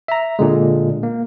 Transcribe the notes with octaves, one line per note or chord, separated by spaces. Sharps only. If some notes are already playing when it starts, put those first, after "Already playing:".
E5 A#5
A#2 D3 G#3
A#3